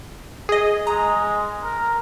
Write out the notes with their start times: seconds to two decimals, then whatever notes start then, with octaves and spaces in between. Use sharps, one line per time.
0.49 G#4 D#5
0.87 G#3 A#5
1.63 A#4